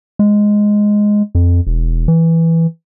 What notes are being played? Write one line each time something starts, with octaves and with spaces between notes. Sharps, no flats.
G#3
F2
E1
E3